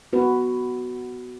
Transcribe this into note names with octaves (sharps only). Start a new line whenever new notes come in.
B3 F#4 B4